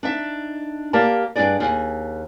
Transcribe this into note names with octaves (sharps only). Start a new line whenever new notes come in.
D4 D#4 E5
A#3 G4 A#4 D5 A5
G2 B2 D4 G#4 D5
D#2 G#4